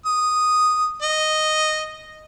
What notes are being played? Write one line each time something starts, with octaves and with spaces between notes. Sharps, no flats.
D#6
D#5